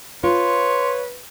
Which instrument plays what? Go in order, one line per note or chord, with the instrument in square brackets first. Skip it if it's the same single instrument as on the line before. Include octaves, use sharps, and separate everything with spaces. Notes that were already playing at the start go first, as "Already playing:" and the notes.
[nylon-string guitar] F4 [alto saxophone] B4 [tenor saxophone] C#5 [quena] C6